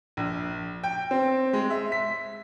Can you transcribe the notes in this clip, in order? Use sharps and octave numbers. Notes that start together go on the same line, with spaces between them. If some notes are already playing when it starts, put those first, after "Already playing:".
A#1
G5
C4
G#3
E5
B6